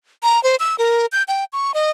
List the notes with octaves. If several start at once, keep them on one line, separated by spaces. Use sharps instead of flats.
A#5
C5
E6
A#4
G6
G5
C#6
D#5